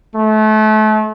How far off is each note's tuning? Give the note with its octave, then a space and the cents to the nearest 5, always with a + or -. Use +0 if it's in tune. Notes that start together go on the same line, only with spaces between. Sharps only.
A3 -30